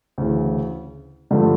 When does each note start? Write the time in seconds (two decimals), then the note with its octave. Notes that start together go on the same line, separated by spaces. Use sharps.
0.18 D2 C#3 E3
1.31 G2 D3 F3 A3